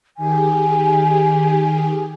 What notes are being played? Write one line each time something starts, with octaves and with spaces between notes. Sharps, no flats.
D#3 G4 G#4 G#5